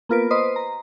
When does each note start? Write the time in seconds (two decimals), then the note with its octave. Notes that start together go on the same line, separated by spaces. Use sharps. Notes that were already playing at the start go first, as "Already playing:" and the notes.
0.09 A#3 B3 F4 A#4 B4 D7
0.31 B4 C5 D#5 C6 D#6
0.56 A#5